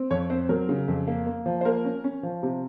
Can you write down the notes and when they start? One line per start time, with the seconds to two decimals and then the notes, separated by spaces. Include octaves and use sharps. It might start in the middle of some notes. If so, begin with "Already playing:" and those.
Already playing: C4
0.11 F2 C#5
0.30 C4 C5
0.49 F#3 A#4
0.69 C#3
0.88 F2
1.07 A#3
1.26 A#3
1.46 F3
1.61 C5
1.65 A#3 A#4
1.85 C#4
2.04 C#4
2.23 F3
2.43 C3